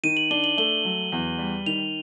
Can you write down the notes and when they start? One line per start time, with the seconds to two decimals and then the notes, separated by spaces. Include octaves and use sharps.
0.04 D#3 D#7
0.17 F#7
0.31 D4 G7
0.44 F#7
0.58 A3 G7
0.85 F#3
1.12 E2
1.39 G3
1.66 D#3 F7